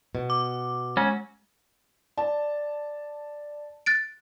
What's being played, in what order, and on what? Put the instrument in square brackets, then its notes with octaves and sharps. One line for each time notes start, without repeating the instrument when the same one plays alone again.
[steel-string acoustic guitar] B2
[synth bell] D6
[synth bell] G#3 [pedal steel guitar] C#4 F#4
[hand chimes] D5 [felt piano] A5
[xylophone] F#6 A6 D7